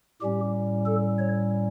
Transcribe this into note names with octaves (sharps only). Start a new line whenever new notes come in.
A2 G3 C#4 G4
A4
C#5